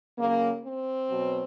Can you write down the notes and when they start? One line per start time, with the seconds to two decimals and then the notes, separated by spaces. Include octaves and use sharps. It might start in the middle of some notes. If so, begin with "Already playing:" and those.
0.18 C#3 F#3 A#3
0.64 C4
1.10 B2 F#3